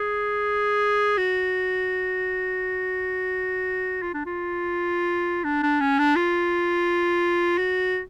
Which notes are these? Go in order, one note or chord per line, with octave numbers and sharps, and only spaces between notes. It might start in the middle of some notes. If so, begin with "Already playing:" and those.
Already playing: G#4
F#4
F4
D4
F4
D4
D4
C#4
D4
F4
F#4